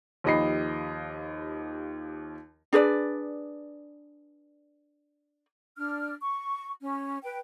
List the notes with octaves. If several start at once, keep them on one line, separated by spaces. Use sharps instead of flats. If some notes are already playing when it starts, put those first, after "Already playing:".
D#2 F3 G4 D#5 B5 C7
D4 G#4 B4 D5
D4 F6
C#6
C#4
B4 G5